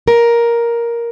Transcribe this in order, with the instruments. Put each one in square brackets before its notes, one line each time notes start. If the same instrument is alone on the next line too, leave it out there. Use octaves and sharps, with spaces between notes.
[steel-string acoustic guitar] A#4